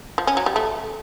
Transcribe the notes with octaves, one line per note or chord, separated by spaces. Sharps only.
F3
C#4
F#3
G3
A3